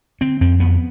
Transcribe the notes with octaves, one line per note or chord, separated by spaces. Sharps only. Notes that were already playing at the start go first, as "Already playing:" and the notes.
D3 C4
F2 C4
F2 B3